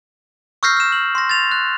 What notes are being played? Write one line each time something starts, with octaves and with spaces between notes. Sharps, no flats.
C#6 E6 F6 G6 A#6 C7
F6 E7
F#7
C6 A#6
A6 F7
F#6